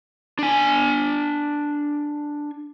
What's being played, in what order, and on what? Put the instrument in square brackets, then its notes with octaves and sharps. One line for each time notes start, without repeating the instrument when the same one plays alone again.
[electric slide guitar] D4 G#5